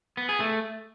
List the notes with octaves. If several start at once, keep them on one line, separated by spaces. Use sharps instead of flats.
B3
G#4
A3